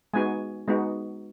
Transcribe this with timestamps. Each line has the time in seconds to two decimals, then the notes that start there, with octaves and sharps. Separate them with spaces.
0.13 G#3 B3 D#4 F#4 G#5
0.68 G#3 B3 D#4 F#4